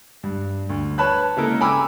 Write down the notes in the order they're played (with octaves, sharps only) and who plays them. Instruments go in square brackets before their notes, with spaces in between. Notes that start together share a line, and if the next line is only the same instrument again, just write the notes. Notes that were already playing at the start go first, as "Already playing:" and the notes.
[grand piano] G2
D2
B4 C#5 A5 B5 F#6
C#3 G#3 A#3 E4 A4 A#4
G5 G#5 A#5 B5 D6 E6